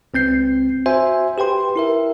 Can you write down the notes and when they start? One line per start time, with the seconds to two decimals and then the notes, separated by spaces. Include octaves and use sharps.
0.14 C#2 C4 G6 C7
0.86 F#4 C5 E5 G#5
1.38 G4 B4 G5 C6
1.76 E4 A#4 E5